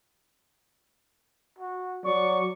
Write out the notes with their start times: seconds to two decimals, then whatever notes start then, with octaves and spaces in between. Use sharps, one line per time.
1.58 F#4
2.04 F#3 D5 C#6